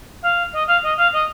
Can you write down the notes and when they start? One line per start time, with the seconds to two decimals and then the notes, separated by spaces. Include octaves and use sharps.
0.22 F5
0.52 D#5
0.67 F5
0.83 D#5
0.97 F5
1.12 D#5